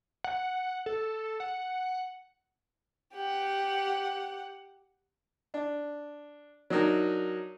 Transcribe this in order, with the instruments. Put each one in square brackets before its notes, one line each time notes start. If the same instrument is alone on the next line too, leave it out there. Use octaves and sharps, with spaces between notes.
[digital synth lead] F#5
A4
F#5
[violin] G4 F#5
[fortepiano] D4
F#3 D4 D#4 A#4